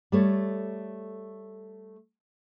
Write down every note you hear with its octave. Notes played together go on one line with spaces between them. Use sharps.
G3 A3 C#5